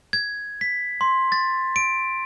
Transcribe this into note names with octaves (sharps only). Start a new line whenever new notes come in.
G#6
B6
C6
A6
D7